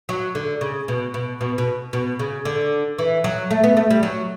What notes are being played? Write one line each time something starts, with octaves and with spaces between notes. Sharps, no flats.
F#3
D3
C#3
B2
B2
B2
B2
B2
C#3
D3
E3
F#3
A3
B3
A3
G3
F#3